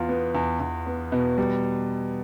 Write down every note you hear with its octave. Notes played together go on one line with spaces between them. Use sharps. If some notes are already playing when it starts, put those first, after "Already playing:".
Already playing: E2 F4
B3
E2
E2
B3
B2
G3